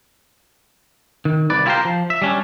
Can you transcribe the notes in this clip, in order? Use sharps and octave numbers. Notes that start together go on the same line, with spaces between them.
D#3
C2 B4 D5
E4 F4 G4 A4 A#4 C5
F3
E5
G3 C#4 D4